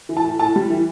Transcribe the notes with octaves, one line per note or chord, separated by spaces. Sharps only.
E3
A5
A2
A2 A5
G3
E3